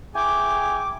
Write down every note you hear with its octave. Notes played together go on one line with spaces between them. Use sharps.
E4 G#4 G5 G#5 C#6 D6